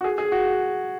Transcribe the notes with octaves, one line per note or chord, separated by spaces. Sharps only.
F#4
G#4
G#4
F#4